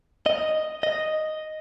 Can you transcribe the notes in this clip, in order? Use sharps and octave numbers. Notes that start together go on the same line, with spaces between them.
D#5
D#5